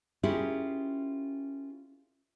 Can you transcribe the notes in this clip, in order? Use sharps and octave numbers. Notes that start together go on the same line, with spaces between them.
C#4 E4 F4 G4 G#4 A#4